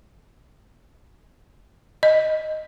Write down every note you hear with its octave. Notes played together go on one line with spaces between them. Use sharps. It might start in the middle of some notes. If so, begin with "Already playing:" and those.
D#5